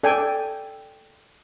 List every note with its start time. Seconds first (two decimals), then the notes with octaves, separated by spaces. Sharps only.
0.03 A4 D5 G5 G#5